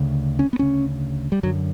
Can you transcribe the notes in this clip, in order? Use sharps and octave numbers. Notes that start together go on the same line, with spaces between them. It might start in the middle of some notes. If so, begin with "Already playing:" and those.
Already playing: D2 C#3
C#4
B3
D2 C#3 C#4
G3
F#2 D3 F#3